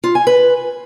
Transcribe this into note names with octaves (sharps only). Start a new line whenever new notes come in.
F4
G#5
B4